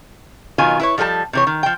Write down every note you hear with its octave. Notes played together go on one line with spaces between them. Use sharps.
B2 D#3 F#3 F4 G#5
E4 B4 C#5
F3 G3 A4 B4 A5
C3 E3 C#5
D#3
F3 G5